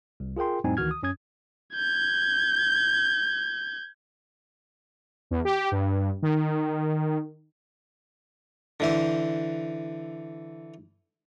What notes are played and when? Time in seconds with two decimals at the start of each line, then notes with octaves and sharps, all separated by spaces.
0.20 C2
0.37 F4 G#4 A#4 G5 C6
0.64 F2 A2 G3 C4 D#4 G#5
0.77 D2 D#3 E3 F#4 F6 G#6
0.91 D#6
1.03 F#2 C#4 D#6 G#6
1.75 G6 G#6
5.31 E2
5.45 G4
5.72 G2
6.22 D#3
8.80 D3 E3 C5